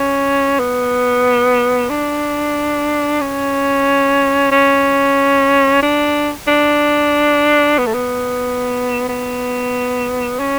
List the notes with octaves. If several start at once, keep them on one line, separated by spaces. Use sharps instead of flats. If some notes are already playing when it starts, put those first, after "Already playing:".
Already playing: C#4
B3
D4
C#4
C#4
D4
D4
B3
A3
B3
B3
C#4